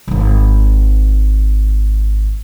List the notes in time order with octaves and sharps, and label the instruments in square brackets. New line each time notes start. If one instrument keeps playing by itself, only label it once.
[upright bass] D#1 G#1